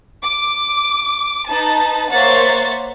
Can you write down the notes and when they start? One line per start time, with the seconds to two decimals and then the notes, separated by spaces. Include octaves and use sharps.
0.24 D6
1.48 D#4 B4 A5
2.12 A#3 C5 C#5 E5 F#5 A6